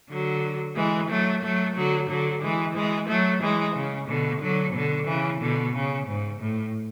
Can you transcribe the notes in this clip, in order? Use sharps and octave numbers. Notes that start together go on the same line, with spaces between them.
D3 F#3
E3 G#3
F#3 A3
F#3 A3
D3 F#3
D3 F#3
E3 G#3
E3 G#3
F#3 A3
E3 G#3
C#3
B2 D3
D3 F#3
B2 D3
C#3 E3
B2 D3
C#3
G#2
A2